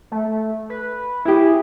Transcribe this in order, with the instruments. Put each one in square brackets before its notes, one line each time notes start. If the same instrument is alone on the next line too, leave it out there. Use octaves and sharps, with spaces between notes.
[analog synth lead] A3
B4
[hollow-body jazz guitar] E4 G4 [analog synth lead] G#4